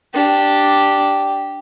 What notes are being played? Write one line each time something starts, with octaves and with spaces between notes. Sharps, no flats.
D4 G4